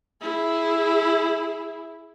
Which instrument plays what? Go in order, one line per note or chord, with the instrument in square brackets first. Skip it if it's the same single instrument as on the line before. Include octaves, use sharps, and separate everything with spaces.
[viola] E4 G#4